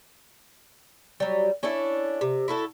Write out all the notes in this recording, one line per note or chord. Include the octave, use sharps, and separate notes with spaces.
F#3 G3
C#4 D4 E4 A4
C3
E4 F#4 A4